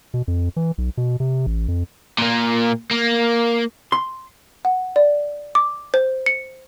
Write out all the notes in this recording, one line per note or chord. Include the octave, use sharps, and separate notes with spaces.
B2
F2
E3
B1
B2
C3
A1
F2
A#2 A#3
A#3
C6
F#5
D5
D6
C5
C#7